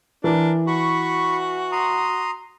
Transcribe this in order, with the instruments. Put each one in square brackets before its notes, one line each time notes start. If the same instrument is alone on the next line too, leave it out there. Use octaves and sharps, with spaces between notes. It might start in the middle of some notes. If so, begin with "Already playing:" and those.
[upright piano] E3 [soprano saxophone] D4 [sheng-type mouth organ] A#4
[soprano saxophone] F#4 [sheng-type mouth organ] B5 C#6
[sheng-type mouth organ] A#5 C6 D#6